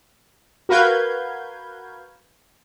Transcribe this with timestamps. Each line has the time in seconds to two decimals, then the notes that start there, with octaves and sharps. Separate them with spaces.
0.69 F#4 A#4 B4 F5 G6 G#6